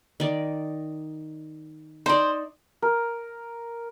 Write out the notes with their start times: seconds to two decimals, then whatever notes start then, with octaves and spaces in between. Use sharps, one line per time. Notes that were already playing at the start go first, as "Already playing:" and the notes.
0.20 D#3 D5
2.06 D#4 C5 D5
2.82 A#4